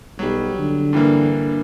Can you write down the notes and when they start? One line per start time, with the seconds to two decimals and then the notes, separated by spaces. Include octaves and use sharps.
0.19 B1 F#3 G3
0.59 D3
0.93 G2 E3 A#3